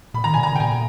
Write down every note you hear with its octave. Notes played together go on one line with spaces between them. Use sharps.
A#2 B5
D#3 A#5
B2 G#5
A#5
C#3
G5
A#2 G#5